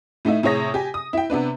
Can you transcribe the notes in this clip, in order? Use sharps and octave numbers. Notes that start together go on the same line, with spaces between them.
A2 A3 D#4 E5
A2 C3 G#4 C#5 D#6 A#6
G4 G#5
D#6
E4 G5
C3 B3 D4 B4